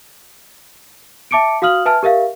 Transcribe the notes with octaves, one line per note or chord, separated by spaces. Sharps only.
E5 A5 D6 C#7 D7
F#4 F5 D#6 F6 F#7
B4 E5 G#5 A5 F6
G4 A#4 E5 F5